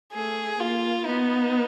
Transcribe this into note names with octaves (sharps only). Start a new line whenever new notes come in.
A3 G#4
A#3 F4
B3 D#4